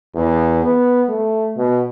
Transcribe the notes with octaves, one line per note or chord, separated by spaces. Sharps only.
E2
B3
A3
B2